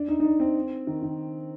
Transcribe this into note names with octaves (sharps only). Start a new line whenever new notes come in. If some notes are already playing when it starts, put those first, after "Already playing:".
Already playing: D4
D#4
D#4
D4
C4
D#3
D#3